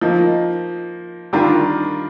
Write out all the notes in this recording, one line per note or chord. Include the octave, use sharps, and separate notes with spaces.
F3 A#3 D#4
D#3 G3 D4 F4 A#4